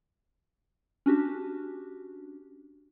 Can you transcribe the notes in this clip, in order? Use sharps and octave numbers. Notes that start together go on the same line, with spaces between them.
C#4 D4 F#4 G4